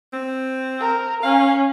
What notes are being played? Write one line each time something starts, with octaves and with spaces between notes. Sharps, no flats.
C4
A#4
C#4 F5